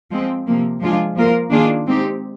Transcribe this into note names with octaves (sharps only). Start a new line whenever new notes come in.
F3 G#3 C4
C3 F3 A#3
F3 G#3 D4 F4 G#4
F3 A#3 F4 A#4
D#3 A#3 D4 F4 G#4
G#3 C4 D#4 G4